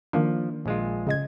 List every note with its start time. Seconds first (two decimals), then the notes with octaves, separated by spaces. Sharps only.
0.13 D#3 F3 A#3 D4
0.66 A#1 G#3 F4
1.07 C#3 D#5 G#6